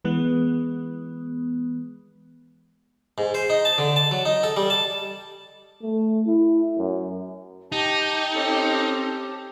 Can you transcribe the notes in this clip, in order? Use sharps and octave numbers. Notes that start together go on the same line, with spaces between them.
E3 G#3 B3
G#2
C5
D#4
A5
D3
A5
F#3
D#4
A4
G3
A5
A3
E4
F#2
D#4 G4 A5
C4 C#4 A4